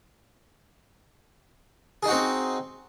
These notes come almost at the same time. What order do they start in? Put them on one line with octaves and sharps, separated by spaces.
G#4 D#4 F#4 C4